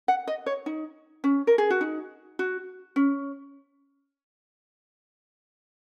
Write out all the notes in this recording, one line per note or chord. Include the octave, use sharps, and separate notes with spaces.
F#5
D#5
C#5
D#4
C#4
A#4
G#4
F#4
D#4
F#4
C#4